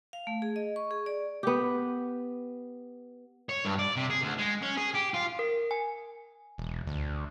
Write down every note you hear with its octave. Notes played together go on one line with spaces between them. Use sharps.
F5
A3
G#4
D#5
C#6
G#4
D5
B3 G4
C#5
G2
D5
C3
G#4
D2
G#3
C#4
G#4
G4
F4
A#4
G#5
E1
D2